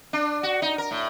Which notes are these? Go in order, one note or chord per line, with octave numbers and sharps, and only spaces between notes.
D4
F#4
D#4
A#4
A2